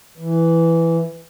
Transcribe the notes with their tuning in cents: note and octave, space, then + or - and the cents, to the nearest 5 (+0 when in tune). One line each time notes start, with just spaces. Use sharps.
E3 +5